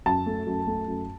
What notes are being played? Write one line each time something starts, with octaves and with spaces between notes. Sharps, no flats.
F#2 A5
A3
F#2
A3
F#2